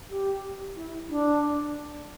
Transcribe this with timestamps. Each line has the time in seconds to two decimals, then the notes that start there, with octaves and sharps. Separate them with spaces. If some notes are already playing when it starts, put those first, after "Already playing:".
0.10 G4
0.76 E4
1.09 D4